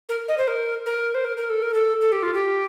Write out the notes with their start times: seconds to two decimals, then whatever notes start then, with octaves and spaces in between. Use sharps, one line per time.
0.09 A#4
0.28 D#5
0.38 C5
0.48 A#4
0.86 A#4
1.14 C5
1.24 A#4
1.37 A#4
1.50 A4
1.62 A#4
1.74 A4
2.01 A4
2.12 G4
2.23 F4
2.34 G4